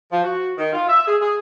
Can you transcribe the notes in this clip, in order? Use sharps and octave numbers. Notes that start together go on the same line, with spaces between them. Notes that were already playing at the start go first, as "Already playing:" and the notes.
F3
F#4
D#3
F4
E5
G#4
G#4